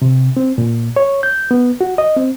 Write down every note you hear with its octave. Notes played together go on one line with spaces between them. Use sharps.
C3
C4
A#2
C#5
G6
B3
F#4
D#5
C4